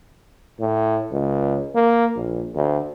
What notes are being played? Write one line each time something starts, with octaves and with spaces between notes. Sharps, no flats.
A2
C#2
A#3
A#1
D2